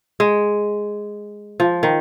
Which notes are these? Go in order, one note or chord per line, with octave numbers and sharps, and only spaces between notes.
G#3
F3
D#3